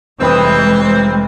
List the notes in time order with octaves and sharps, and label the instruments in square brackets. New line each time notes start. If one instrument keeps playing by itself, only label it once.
[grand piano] F1 B4 D#6 [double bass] E3 [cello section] G3 G#3 [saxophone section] C4